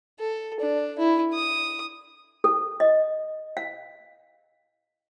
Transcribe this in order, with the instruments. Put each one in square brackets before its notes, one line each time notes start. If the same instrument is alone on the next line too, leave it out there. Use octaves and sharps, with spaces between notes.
[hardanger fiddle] A4
D4
E4
D#6
[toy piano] A4
D#5
F5